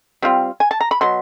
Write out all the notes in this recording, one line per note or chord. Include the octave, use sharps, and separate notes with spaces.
G3 C4 F4
G#5
A5
A#5
B5
B2 F#3 B3 C6